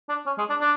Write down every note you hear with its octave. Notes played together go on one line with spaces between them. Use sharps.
D4
C#4
G#3
D4
D4